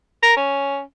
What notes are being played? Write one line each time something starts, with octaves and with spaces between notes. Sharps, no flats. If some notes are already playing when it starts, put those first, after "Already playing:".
A#4
C#4